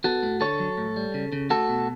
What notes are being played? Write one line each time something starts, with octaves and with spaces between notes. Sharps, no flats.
B3 F#4 A4
A2
D3 A4 C#5
F#3
A2
G3
C#3
C#3
A3 F#4 A4
B2